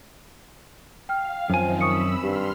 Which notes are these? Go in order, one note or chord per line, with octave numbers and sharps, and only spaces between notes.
F5 G5 F6
F#2 D#3 F3 C4 G#5
B5 C#6 D#6 E6 C#7
G2 G4 C6 F6